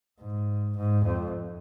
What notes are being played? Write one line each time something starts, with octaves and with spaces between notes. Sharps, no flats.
G#2
G#2
F2